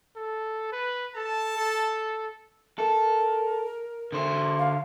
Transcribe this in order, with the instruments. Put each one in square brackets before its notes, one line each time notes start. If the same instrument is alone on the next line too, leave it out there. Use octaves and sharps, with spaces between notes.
[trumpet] A4
B4
[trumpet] A4 [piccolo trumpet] A5
[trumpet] A4
[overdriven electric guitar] A4 [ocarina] A#4
[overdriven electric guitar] D3 C5
[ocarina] F5